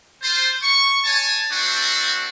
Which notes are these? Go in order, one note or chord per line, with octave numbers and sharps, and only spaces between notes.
F4 C5
C#6
C#5 G#5 A5
A3 C4 D4 F#4